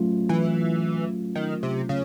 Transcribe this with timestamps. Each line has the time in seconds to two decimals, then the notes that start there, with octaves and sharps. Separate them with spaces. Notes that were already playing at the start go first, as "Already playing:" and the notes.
Already playing: F#3 A3 C#4 F4
0.29 E3
1.35 D#3
1.63 C3
1.89 C#3